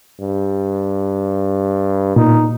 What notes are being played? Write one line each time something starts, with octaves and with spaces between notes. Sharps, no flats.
G2
A#2 D#4